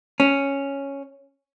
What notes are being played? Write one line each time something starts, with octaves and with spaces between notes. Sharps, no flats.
C#4